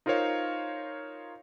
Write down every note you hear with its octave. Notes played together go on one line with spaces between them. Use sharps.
D#4 F4 A#4 C5 C#5 F5